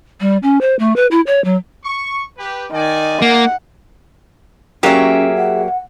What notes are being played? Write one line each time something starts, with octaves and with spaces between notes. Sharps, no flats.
G3
C#4
C5
A3
B4
E4
C#5
F#3
C#6
G4 B4
D#3 D#4 D5 G#5
A#3 F#5
F#3 A#3 C#4 G4 G#4 E5
F#5